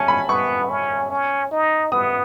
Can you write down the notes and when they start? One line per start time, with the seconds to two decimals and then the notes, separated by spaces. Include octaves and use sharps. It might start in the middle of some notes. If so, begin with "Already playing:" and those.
Already playing: C#4 G#5 A5
0.08 B5
0.28 B3 C#6
0.70 C#4
1.10 C#4
1.51 D#4
1.92 B3 D#6